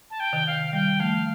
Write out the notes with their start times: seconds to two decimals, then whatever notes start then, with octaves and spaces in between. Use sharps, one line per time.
0.11 A5
0.20 G5
0.33 C3 D#3
0.47 F5
0.73 D#3 G3 G5
1.00 F3 A3 F5